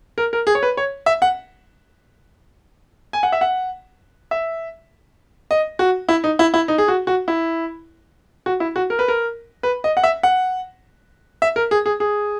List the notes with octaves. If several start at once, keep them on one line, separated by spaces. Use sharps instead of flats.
A#4
A#4
G#4
C#5
B4
C#5
E5
F#5
G#5
F#5
E5
F#5
E5
D#5
F#4
E4
D#4
E4
E4
D#4
G#4
F#4
F#4
E4
F#4
E4
F#4
A#4
B4
A#4
B4
D#5
F#5
E5
F#5
E5
A#4
G#4
G#4
G#4